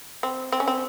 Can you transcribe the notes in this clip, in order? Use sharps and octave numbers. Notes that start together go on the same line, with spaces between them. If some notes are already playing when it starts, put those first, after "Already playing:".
C4
C4
C#4
C4